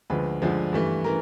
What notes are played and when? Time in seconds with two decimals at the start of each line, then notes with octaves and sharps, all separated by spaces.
0.10 D2 D3 F3 G#3 B4
0.42 D2 D3 F3 G#3
0.73 G2 E3 A3
1.04 E3 A#4